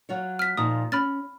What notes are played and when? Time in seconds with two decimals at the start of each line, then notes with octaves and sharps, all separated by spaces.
0.09 F#3 F4 C#5
0.39 F6 B6
0.57 A#2 F3 D#4 D#6
0.92 C#4 B5 F6 A6